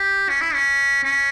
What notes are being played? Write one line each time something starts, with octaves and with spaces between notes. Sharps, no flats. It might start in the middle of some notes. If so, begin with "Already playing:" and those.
Already playing: G4
C#4
E4
C#4
C#4